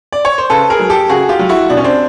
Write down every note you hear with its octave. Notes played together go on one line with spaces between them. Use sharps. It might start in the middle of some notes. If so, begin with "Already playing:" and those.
D5
C#5
C5
C#3 A4 B4
G#4 A#4
F#3
G4 A4
C#3 F#4 G#4
F4 G4
F#3
E4 F#4
B2 D4
C#4
C4 D4